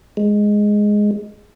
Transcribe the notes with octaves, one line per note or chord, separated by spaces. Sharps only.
G#3